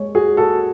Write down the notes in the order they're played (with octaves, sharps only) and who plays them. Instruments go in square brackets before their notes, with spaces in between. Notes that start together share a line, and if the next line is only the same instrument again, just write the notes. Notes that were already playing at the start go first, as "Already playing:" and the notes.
Already playing: [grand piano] G#3 C#5
[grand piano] F#4 [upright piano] G#4
[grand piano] F#4 [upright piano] A4